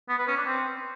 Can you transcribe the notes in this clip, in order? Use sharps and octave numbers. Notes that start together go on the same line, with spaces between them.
B3
B4
C#4
D4
C4